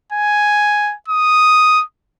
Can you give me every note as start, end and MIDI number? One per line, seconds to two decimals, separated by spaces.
0.12 0.94 80
1.08 1.83 87